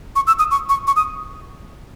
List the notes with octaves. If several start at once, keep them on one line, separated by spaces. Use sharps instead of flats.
C#6
E6
D#6
C#6
C#6
C#6
D#6